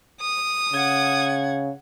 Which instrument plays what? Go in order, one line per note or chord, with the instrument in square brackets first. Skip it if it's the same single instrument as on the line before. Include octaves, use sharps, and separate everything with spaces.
[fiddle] D#6
[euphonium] C#3 [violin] F#5 G#6